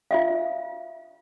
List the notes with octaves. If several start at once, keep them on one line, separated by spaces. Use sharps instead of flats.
F4 E5 F5